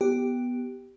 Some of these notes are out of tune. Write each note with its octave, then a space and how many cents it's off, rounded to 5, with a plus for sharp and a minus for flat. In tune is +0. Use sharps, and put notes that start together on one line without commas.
B3 +0 G4 +0